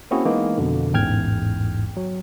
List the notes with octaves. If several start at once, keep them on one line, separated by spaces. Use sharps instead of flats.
A#3 C4 C#4 E4 F#4 G#4
E3 G#3 A#3 B3 D#4
F2 B2 D3
A1 E2 G#2 G5 F6 G#6
F#3